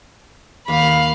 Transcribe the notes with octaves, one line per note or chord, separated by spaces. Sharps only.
D#2 F5 B5